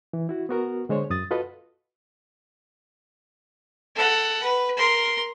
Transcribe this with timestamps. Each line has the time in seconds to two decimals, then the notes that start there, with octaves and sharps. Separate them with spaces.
0.13 E3
0.29 E4 F#4
0.49 B3 F#4 A#4
0.89 D3 G#3 C5 C#5
1.10 F#2 D#6 A6
1.31 F4 F#4 A4 B4 D#5
3.95 A4 F#5
4.43 B4
4.77 A#4 C6